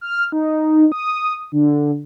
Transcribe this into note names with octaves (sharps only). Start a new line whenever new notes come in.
F6
D#4
D#6
D3